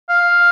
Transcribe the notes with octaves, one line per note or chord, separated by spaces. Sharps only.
F5